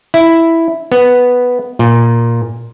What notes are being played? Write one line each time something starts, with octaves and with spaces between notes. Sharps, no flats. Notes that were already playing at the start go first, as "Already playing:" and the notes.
E4
B3
A#2